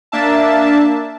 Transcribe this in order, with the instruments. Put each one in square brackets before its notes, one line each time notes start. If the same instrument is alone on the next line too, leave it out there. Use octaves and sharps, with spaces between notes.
[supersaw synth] A#3 D4 E5 A5